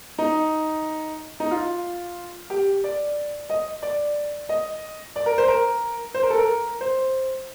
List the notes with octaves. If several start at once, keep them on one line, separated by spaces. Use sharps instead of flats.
D#4
D#4
F4
G4
D5
D#5
D5
D#5
D5
A#4
C5
A#4
C5
A#4
A4
A#4
C5